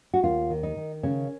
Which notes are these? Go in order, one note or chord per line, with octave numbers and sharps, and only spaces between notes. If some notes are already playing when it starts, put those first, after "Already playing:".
F#4
D#2 F4
D#3
D#4
D#3
C#3 C#4